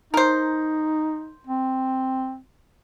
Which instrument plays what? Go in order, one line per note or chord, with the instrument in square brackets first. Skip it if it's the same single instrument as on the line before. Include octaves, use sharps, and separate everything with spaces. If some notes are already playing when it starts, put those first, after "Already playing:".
[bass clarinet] D#4 [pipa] A#4 C5
[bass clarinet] C4